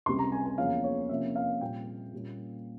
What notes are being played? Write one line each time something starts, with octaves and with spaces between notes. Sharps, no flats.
C#2 C3 G3 C6
A#5
G#5
G#5
E2 C#3 F3 A#3 C#4 F5
C#5
C3 F3 A#3 C#4 E5
F5
A#2 G3 C4 G5
A#2 G3 A#3 C#4